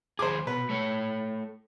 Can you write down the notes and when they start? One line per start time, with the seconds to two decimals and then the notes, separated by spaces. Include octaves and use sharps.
0.19 D#2 G#4 C5 D6
0.47 B2 B4
0.69 A3 C#5